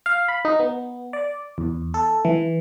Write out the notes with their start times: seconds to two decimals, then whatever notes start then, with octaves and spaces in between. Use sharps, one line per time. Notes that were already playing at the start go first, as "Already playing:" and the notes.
0.06 F5
0.28 B5
0.45 D#4
0.59 B3
1.13 D5
1.58 E2
1.94 A4
2.25 E3